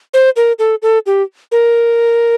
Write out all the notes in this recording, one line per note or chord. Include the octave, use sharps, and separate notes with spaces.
C5
A#4
A4
A4
G4
A#4